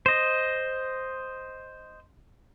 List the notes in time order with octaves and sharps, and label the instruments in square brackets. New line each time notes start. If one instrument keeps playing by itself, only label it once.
[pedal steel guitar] C5 D#5